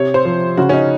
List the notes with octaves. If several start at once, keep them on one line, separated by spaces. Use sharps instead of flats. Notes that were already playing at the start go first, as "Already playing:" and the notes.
Already playing: C3 C#5
C5
F3
C#3 F#4
C#4
D#4